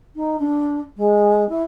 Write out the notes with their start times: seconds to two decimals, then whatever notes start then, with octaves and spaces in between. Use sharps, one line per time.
0.15 D#4
0.39 D4
0.97 G#3
1.49 E4